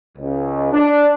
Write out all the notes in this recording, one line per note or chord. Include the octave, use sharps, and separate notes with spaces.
C#2
D4